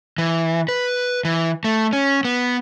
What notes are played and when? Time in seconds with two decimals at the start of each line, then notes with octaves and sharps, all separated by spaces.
0.18 E3
0.68 B4
1.25 E3
1.64 A3
1.93 C#4
2.25 B3